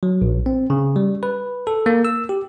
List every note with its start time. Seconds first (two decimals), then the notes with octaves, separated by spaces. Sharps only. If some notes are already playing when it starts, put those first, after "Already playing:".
0.03 F#3
0.22 A#1
0.46 C4
0.70 C#3
0.96 G3
1.23 B4
1.67 A4
1.86 A#3
2.05 E6
2.29 G4